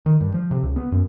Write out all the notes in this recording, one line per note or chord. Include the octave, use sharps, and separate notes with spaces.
D#3
G2
F3
C3
C#2
B3
F#2